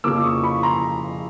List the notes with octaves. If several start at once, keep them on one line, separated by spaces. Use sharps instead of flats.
F2 C#3 F3 A#3 D6 E6
C#6 D#6
B5 C#6
A#5 C6